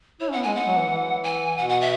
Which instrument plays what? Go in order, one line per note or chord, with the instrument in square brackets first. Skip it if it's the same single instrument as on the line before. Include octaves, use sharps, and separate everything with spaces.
[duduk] E4 [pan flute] C#5
[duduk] C#4 [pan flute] F#5
[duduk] B3
[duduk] G#3 [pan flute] G#5
[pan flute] F#5
[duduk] F#3
E3
E3
[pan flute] G#5
[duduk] B2 [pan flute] F#5
[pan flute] F#5
E5